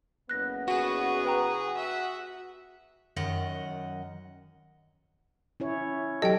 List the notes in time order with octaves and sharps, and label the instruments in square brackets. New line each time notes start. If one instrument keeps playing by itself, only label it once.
[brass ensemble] F#1 B3 [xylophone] F#6 A#6
[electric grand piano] F#4 [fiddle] G#4
[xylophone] B4 G5 A#5
[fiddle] E5 F#5
[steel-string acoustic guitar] F#2 D#3 D#5 F#5
[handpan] C#4 E4 C#5
[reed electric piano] F#3 G4 A4 [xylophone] D#5 G5